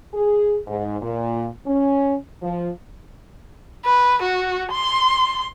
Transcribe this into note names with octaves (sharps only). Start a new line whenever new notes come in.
G#4
G#2
A#2
C#4
F3
B4
F#4
C6